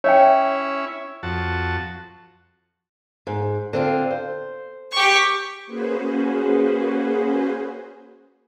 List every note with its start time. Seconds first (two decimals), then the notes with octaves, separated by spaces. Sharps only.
0.04 C#4 E4 C#5 E5 G5
1.23 F2 F#4 A5
3.27 G#2
3.73 D3 C4 F4
4.11 C5
4.92 G4 C#6
5.67 A#3 C#4 F#4 G#4 B4 C5